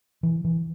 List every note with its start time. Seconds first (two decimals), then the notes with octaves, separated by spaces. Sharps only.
0.23 E3
0.44 E3